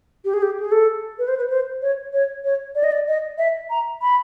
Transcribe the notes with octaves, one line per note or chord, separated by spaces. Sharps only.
G4
G#4
G4
G#4
A4
B4
C5
B4
C5
C#5
C#5
C#5
D5
D#5
D5
D#5
E5
A#5
B5